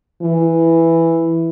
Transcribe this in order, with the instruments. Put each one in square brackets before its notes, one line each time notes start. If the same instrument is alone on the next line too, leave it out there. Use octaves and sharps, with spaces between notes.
[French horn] E3